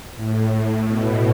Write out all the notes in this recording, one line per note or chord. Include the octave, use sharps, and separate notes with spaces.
A2
B2